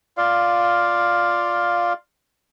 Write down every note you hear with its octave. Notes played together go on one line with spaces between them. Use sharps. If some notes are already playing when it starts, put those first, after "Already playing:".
F4 D5 F5